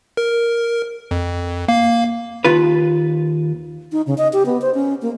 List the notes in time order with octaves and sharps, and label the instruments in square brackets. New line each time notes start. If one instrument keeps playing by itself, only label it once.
[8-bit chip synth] A#4
F2
A#3 F5
[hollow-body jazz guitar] D#2 F4 B4
[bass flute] D#4
C#3
D#5
G4
B3
C5
C#4
A#3